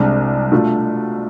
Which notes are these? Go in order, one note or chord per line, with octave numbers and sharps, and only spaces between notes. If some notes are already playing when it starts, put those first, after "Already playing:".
Already playing: C2 C3 G#3 D4
B2 A3 D4 F4